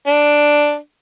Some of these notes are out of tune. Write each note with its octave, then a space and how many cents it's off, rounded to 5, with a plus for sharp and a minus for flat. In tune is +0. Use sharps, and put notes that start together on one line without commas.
D4 +5